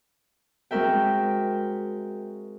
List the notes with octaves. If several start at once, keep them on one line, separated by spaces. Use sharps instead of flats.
G#3 C4 F#4 A#4 E5 G5